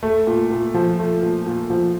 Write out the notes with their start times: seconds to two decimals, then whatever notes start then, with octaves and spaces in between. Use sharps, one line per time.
0.03 A3
0.27 A#2
0.50 A#2
0.74 F3
0.99 A3
1.22 A#2
1.46 A#2
1.70 F3